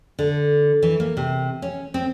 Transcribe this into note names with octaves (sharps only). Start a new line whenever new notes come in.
D3
E3
A#3
C3
C#4
C4